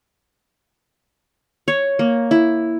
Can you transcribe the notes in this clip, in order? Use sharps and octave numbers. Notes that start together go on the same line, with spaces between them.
C#5
A#3
E4